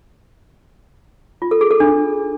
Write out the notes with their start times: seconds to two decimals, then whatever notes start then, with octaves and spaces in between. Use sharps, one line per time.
1.42 F4
1.51 A4
1.61 G#4
1.71 A4
1.80 D4